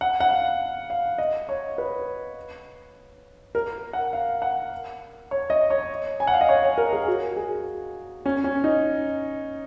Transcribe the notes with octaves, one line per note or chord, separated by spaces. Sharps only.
F#5
F#5
F5
F5
D#5
C#5
B4
A#4
F#5
F5
F#5
C#5
D#5
C#5
G#5
F#5
F5
D#5
C#5
C#5
A#4
G#4
F#4
G#4
C#4
C#4
D#4